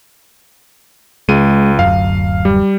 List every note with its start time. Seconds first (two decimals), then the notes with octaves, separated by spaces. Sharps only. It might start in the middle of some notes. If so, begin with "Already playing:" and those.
1.29 C#2 G#3 D#7
1.79 D1 F#2 F5
2.45 G3